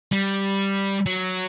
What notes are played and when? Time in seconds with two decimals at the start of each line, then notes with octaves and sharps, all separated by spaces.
0.12 G3
1.06 F#3